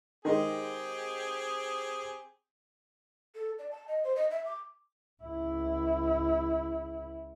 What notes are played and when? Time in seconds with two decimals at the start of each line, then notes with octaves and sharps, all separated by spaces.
0.25 D#3 G#3 C4 G4 G#4
3.35 A4
3.59 D5
3.71 A5
3.88 D#5
4.04 C5
4.16 D#5
4.31 E5
4.46 D6
5.23 C#2 E4